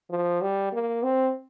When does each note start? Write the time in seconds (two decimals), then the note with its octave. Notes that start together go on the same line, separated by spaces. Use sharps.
0.10 F3
0.42 G3
0.72 A#3
1.03 C4